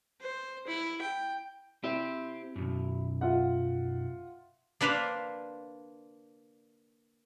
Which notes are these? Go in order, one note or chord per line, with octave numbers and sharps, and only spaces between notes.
C5
E4
G5
C4 E4 G4
B1 F#2
F4 E5 F#5
A#3 D4 B4 C5 F5